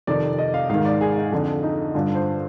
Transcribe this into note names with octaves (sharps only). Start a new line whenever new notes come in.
F2 C3 D#3 D5
D#5
F5
G#2 D#3 F5
D5
G#4
D#4
F2 D3
D#4
G2 D3 F4
C5